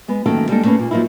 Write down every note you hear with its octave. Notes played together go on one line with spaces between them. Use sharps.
G#3 B3
F#2 D#3 A3 A#3 A4 G5
G3 G#3 A#3 D4 A4
A3 A#3 C#4 G#4 B4
A#2 A#3
F3 F#3 A#3 D#4 E4